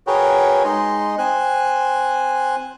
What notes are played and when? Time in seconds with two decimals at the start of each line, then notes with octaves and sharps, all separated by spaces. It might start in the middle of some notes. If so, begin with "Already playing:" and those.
0.07 F#4 G#4 A#4 B4 C#5 G5
0.65 G#3 D#4 D#5 C6
1.18 C4 C5 G#5 F#6